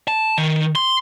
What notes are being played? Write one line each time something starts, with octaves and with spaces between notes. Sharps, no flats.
A5
D#3
C6